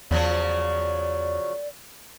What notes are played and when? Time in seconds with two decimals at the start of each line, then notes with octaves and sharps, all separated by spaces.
0.11 E2 C#3 F3 F#3 D5